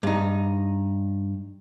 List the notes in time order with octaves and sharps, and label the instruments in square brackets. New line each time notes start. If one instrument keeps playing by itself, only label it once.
[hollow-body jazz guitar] G2 D#4